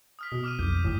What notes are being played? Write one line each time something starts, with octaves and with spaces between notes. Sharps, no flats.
D#6 F6 B6
B2
D6 F6 D#7
B1 F2 G6
G1 A2 D#6